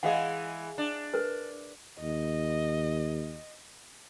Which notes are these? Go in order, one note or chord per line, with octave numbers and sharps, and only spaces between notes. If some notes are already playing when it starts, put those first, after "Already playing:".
E3 G#3 G#4 D#5 F5 F#5
D4
A#4 B4
D#2 D#5